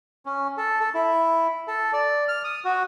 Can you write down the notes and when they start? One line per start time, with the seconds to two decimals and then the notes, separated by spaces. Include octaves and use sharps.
0.26 C#4
0.57 A4
0.80 A4
0.94 E4
1.68 A4
1.93 D5
2.28 F6
2.44 D#6
2.65 F#4